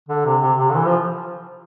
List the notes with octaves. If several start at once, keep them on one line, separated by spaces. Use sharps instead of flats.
D3
C3
C3
C3
D3
E3
F3